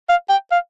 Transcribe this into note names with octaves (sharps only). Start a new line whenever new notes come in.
F5
G5
F5